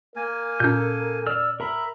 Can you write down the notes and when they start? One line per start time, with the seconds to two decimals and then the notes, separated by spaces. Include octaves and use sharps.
0.16 A#3 A#4 G#5
0.60 A#2 C#4 A4 G6
1.27 D5 E6 F6
1.60 A#4 E5 A#5 B5